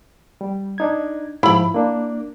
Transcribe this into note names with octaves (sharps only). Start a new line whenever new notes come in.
G3
D4 D#4 G#6
G#2 F3 E4 B5
A#3 D4